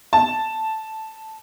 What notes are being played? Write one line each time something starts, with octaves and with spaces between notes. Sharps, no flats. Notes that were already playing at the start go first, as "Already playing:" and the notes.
A5